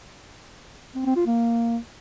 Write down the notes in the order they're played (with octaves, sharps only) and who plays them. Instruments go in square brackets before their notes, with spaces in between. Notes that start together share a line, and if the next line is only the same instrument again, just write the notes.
[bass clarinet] C4
C4
F4
A#3